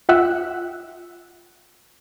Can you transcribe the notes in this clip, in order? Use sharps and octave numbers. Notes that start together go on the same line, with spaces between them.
F4 E5 F#5 G5 E6 F#6